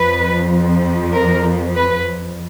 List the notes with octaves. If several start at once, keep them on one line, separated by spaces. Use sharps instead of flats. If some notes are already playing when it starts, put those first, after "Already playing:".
Already playing: F2 F3 B4
A#4
B4